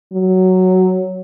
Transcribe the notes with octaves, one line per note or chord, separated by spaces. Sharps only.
F#3